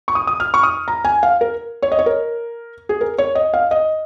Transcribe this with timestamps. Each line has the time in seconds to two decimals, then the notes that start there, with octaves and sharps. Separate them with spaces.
0.08 C#6
0.15 D#6
0.27 D#6
0.40 F6
0.54 C#6
0.63 D#6
0.88 A#5
1.05 G#5
1.23 F5
1.41 A#4
1.82 C#5
1.92 D#5
1.99 C#5
2.06 A#4
2.89 G#4
3.01 A#4
3.18 C#5
3.35 D#5
3.54 F5
3.71 D#5